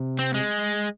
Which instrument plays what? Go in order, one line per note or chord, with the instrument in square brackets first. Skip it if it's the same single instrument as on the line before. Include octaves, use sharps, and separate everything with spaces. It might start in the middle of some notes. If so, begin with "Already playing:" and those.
Already playing: [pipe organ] C3
[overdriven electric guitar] C4
G#3